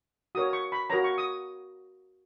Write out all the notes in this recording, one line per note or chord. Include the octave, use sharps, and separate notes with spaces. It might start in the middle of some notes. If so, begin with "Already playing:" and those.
F#4 A#4 C#5 D#6
C#6
B5
F#4 A#4 C#5 A#5
C#6
D#6